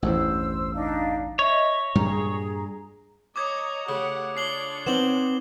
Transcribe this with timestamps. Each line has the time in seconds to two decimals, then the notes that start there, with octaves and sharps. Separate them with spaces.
0.02 A1 E2 G2 C5 E6
0.73 D4 D#4 F5
1.39 C#5 D#5 E5
1.95 G2 A#2 G3 G#4 A#5
3.36 C#5 D#5 A#5 D6 D#6 G#6
3.89 C#3 A3 G4 F#5
4.37 D4 F4 C#5 C7 F#7 G7
4.87 B3 C4 D#4 E7 F#7 G7